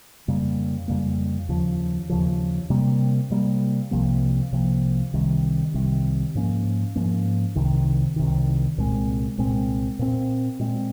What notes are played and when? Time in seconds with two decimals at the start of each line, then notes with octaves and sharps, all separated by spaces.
0.28 F2 C#3 G3 A#3
0.88 F2 C#3 G3 A#3
1.49 D#2 C#3 F3
2.09 D#2 C#3 F3
2.70 C3 G3 A#3
3.30 C3 G3 A#3
3.91 C2 C3 F3 A#3
4.52 C2 C3 F3 A#3
5.14 C2 C3 D#3 G3
5.74 C2 C3 D#3 G3
6.35 G#2 F3 A#3 C#4
6.95 G#2 F3 A#3 C#4
7.56 C2 C3 D#3
8.16 C2 C3 D#3
8.78 C2 A#2 G#3 C4
9.38 C2 A#2 G#3 C4
9.99 A#2 G#3 C4
10.59 A#2 G#3 C4